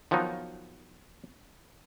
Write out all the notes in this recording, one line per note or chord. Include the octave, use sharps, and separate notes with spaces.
D#3 F3 F#3 B3 D#4